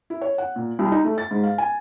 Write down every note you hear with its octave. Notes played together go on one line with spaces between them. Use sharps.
E4
C#5
F#5
A#2
C2
D#4
A3
A6
G#2
F5
G#5